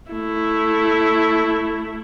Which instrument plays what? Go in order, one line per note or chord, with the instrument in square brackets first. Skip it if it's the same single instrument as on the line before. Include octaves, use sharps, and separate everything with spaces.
[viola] A3 E4